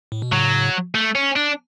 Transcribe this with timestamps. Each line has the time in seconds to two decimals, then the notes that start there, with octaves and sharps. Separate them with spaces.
0.12 A2
0.22 B2
0.32 A2 C#3 F#3
0.95 A3
1.15 C#4
1.36 D4